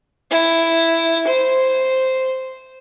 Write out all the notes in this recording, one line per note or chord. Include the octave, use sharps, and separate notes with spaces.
E4
C5